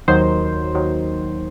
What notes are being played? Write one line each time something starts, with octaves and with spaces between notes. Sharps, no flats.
D#2 D#3 F#3 C5
D#2 D#3 F#3